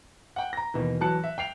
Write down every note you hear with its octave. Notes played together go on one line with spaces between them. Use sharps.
F#5 G5
A#5 A#6
D#2 B2 E3
E3 F#3 A5 F#6 C#7
E5
G5 C7 F7